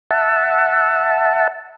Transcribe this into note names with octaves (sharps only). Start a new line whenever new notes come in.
E5 F#5 A5